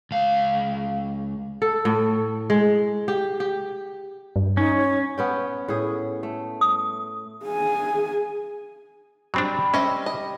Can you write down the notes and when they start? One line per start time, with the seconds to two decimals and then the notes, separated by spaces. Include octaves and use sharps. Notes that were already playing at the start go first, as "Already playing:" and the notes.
0.11 C#2 F5
1.62 A4
1.85 A2
2.50 G#3
3.08 G4
3.40 G4
4.36 G2
4.57 C#4 D#4
4.77 C#5
5.18 B3 C#4 G5
5.68 A2 G#4
6.23 A3
6.61 D#6
7.45 G#4 G#5
9.34 F#3 G3 C4 D4
9.74 C4 C#4 D#5 E5
10.06 D#5